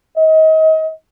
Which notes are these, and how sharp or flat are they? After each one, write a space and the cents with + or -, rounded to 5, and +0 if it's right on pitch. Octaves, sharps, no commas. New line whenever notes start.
D#5 +30